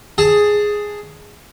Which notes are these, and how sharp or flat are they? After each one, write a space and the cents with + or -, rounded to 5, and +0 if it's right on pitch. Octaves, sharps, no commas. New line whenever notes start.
G#4 +0 A5 +10